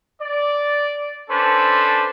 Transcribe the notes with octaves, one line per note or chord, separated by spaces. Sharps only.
D5
C#4 D4 A4 B4 C5